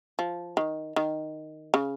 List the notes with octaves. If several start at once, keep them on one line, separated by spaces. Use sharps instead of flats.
F3
D#3
D#3
C#3